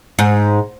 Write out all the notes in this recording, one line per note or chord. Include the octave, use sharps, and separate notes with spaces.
G#2